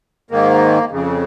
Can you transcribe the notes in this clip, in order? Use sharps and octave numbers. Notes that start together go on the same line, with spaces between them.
G#2 D#3 A#3
F2 C#3